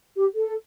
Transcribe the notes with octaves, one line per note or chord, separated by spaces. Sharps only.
G4
A4